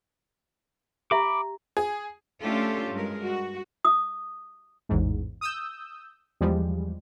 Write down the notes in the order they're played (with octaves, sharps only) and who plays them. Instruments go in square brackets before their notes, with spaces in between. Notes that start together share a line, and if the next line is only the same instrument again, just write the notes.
[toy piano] G4 E5 A#5 [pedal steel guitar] B5 D6
[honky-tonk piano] G#4
[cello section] A3 C#4 D4 F4 G4 A4
G2 G#3 A#4
F#4
[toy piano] D#6
[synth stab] A1 E2 G#2
D#6 E6 G6
E2 F3 G3 G#3